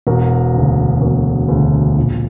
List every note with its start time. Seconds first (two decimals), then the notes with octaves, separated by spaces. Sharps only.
0.07 E1 F#4 A#4
0.54 D2 C#3
1.01 E1 F#4 A#4
1.49 D2 C#3
1.96 A#1